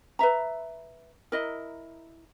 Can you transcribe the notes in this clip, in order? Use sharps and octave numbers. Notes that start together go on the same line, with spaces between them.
B4 E5 A#5
E4 A#4 D#5